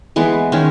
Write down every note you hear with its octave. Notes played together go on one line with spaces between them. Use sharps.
E3 G#3 B3
D#3 G#3 C#4